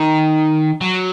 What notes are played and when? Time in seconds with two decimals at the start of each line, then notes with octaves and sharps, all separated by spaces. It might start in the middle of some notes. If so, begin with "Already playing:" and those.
Already playing: D#3
0.81 F#3